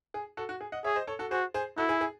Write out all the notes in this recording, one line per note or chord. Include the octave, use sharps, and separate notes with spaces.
G#4
F#4 A4
F#4
G#4
D#5 F#5
G#4 C#5 E5
C5 D#5
A4 C#5
F#4 A4
F#4 G#4 C5
G#4 C5
E4 F#4 A4
G#4
G#4